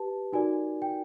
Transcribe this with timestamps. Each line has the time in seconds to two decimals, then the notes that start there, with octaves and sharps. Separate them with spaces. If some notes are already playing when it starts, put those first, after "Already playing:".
Already playing: G4 B4 A5
0.33 D#4 F#4 A#4 D5 G#5
0.82 G5